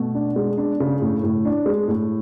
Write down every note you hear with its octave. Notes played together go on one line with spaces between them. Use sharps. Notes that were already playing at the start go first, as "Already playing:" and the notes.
Already playing: B2 A3
D4
G#3
D4
C#3
A2
A2
D4
G#3
A2